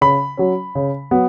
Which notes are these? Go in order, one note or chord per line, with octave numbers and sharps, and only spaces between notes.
C#3 B5
F#3 C#4
C#3
F#3 B3